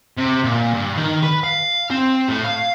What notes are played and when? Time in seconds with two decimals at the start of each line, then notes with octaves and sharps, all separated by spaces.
0.18 C3
0.44 A#2
0.74 G2
0.96 D#3
1.23 B4
1.44 F5
1.90 C4
2.29 A2
2.44 F5